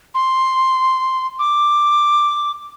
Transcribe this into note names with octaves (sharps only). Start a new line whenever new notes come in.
C6
D6